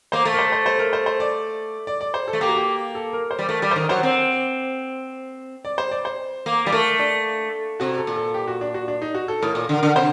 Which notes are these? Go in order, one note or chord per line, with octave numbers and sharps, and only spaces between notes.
A#3 C5
A3
A#4
C5
C5
C5
A#4
C5
C5
D5
D5
D5
C5
A4
A3
A#3 G4
F#4
G4
A4
A#4
C5
G3
A3 A#4
G3
C5
D#3 A#4
F#3 C5
C4
D5
C5
D5
C5
A#3
G3
A3 A#4
D4
C3 F#4
A4
A#2
A4
G4
F#4
D4
F#4
D4
D#4
F#4
A4
A2 A#4
A#2
D3
A#4
D3
C3 C5